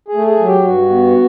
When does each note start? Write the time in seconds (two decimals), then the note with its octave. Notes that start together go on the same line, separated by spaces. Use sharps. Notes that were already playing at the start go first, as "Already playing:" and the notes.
0.08 G#4
0.15 A3
0.27 G#4
0.39 F#3
0.46 G4
0.64 G2 F#4
0.89 B3